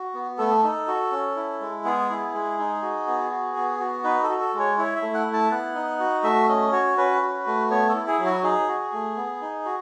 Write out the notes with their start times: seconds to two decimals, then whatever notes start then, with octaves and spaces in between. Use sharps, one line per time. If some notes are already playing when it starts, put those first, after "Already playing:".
Already playing: F#4
0.14 B3
0.38 A3 A4
0.63 D#4
0.88 F#4
1.11 C#4
1.36 E4
1.61 G#3
1.85 B3 G#4
2.10 E4
2.34 G#3
2.59 D#4
2.82 F#4
3.07 B3
3.31 F#4
3.56 B3
3.80 F#4
4.04 D#4 B4
4.23 A4
4.29 F#4
4.41 A4
4.54 G#3
4.59 C#5
4.78 E4 C#5
4.95 E5
5.02 A3
5.14 F#5
5.27 E4
5.33 A5
5.51 B3 F#5
5.75 D#4
6.00 F#4
6.23 A3 E5
6.49 C#4 D#5
6.72 F#4 C#5
6.97 C#4 B4
7.22 F#4
7.47 A3
7.70 B3 C#5
7.89 A4
7.94 E4
8.07 G#4
8.19 F#3
8.25 F#4
8.43 D#4 G#4
8.68 F#4
8.93 A3
9.16 B3
9.42 D#4
9.65 F#4